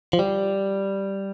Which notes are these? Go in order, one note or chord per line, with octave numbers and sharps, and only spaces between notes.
F3
G3